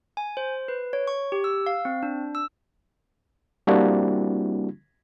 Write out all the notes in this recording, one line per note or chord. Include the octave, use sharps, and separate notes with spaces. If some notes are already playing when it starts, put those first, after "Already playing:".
G#5
C5
B4
C#5
C#6
G4
E6
F5
C4
D4
E6
G3 A#3 C4 D4 E4 F#4